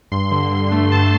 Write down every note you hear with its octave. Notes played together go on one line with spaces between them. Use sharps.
G2 C6
D3
G2
A3
G2 A5